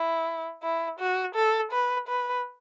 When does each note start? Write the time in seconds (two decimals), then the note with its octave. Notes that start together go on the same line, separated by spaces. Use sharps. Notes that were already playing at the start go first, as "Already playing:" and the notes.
Already playing: E4
0.63 E4
0.99 F#4
1.35 A4
1.72 B4
2.08 B4